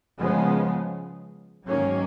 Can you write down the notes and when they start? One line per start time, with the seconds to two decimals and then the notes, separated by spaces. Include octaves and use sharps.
0.18 C#3 F3 G#3 B3
1.66 G#2 D#3 F#3 A#3 C#4